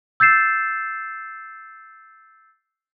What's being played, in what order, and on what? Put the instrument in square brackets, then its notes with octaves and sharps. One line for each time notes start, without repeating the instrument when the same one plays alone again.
[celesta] E6 G6 A6 C7 E7